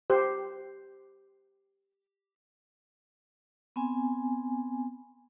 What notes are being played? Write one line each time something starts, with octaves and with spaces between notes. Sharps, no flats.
G4 C5
B3 C4 G#5